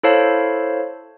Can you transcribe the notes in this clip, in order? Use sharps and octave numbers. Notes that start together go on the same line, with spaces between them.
E4 A4 C5 C#5 F5 A5